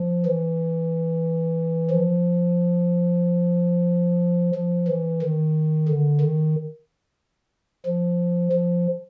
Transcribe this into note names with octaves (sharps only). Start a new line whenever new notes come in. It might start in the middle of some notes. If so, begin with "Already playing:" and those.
Already playing: F3
E3
F3
F3
E3
D#3
D3
D#3
F3
F3